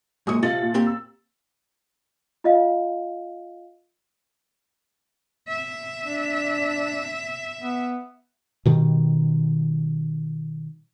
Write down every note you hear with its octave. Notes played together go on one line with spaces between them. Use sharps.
F#2 A#2 G#3 D#6 C#7
C3 F4 A4 D#5 A6 F#7
A#2
A#3 C4 G4
E6
F4 D#5 F5
E5
D4
B3
B2 D#3 G3